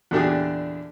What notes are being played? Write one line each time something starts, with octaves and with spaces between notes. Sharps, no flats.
E2 A#2 D3 D4 G4 G#4